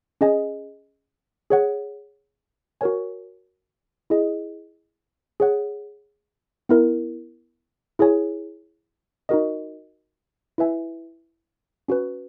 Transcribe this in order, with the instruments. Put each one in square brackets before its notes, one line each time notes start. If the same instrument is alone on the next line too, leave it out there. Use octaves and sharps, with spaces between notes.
[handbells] C#4 G#4 D#5 G#5
G#4 C#5 F#5
F#4 A#4 C#5 G#5
E4 G#4 D#5
G#4 C#5 F#5
B3 E4 A#4
E4 G#4 C#5 G#5
D#4 F#4 A#4 D#5
E4 B4 E5 G#5
C#4 F#4 B4